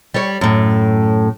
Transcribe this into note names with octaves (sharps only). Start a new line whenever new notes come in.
G3 C#5
F#2 A2